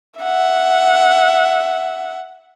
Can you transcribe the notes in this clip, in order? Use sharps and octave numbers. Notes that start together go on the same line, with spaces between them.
E5 F#5